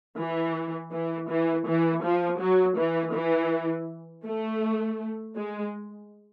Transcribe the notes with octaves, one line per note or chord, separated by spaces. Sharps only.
E3
E3
E3
E3
F3
F#3
E3
E3
A3
G#3